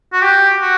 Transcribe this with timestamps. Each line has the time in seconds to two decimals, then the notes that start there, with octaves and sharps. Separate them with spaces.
0.13 F#4
0.22 G4
0.61 F#4